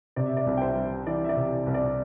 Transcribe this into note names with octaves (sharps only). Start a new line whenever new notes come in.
C3 D5
E5
D5
C2
G5
C5 E5
G3
E3 D5
E5
D5
C3
C2
D5